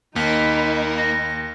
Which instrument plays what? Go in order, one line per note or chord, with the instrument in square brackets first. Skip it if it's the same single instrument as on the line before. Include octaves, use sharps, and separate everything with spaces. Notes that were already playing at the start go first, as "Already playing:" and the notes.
[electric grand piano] D#2 [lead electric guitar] A#3 [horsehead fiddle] D#4 B5 [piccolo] B6
[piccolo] A#6